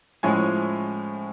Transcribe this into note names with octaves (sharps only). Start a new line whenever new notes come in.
A2 F3 G#3 C#4 G#5